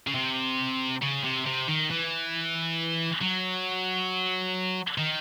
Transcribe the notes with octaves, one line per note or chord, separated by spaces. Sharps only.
C#3
C3
C#3
C3
C3
D#3
E3
F#3
D#3